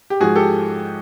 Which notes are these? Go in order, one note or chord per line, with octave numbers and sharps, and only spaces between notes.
G4
G#2 F3 F#4 G#4
G4 A4